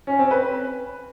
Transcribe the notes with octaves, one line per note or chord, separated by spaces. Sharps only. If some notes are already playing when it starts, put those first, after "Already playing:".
C#4
C4
B4